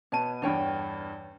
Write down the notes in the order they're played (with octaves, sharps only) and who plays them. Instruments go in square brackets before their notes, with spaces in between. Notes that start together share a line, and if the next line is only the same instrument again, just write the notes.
[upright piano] B2 B3 D#7 [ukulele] C#5 A5
[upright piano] E2 G2 [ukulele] D4 C#5 G5